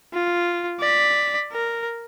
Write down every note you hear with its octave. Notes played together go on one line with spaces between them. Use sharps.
F4
D5 B6
A#4